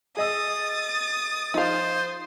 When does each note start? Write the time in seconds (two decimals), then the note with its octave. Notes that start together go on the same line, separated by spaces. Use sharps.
0.17 G#4 D#5 D#6 E6 A6
1.54 F3 D#4 C5 F5